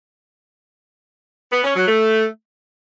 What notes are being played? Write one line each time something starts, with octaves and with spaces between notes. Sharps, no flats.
B3
C#4
F#3
A3